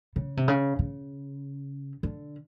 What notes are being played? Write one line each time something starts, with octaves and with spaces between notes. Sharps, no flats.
C#3
C3
C#3
C#3
D3